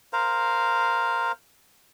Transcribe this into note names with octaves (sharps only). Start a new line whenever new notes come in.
A#4 C5 F5